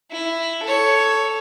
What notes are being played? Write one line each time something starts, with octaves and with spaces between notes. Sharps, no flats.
E4
A4 C#5